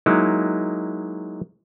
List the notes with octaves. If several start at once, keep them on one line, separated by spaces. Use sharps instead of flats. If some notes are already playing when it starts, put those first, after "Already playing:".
F#3 G#3 A#3 D#4 E4